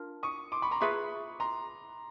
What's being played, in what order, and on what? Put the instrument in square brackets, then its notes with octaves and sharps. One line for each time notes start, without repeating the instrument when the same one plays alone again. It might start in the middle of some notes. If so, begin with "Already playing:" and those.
Already playing: [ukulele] D4 F4 A#4
[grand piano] C#6 D#6
C6 D6
B5 C#6
A#5 C6
[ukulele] F4 G#4 B4 E5 [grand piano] B5 C#6
[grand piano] A#5 C6